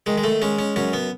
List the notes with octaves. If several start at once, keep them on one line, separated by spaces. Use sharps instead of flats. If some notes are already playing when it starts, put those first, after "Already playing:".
D#3 G#3
G#3
A3
G#3 C#4
C#4
F#2 C#4
B3